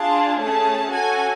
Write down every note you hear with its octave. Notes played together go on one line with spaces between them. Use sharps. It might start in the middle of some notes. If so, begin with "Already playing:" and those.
Already playing: D4 F4 G#4 A5
A3 C#4 G#4 A5
C#4 F#4 A4 G#5